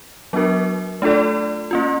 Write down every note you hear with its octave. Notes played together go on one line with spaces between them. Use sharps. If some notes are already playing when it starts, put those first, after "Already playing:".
F#3 B3 D4 F#4 A#4
A3 D4 F4 A4 D5
A#3 C#4 F4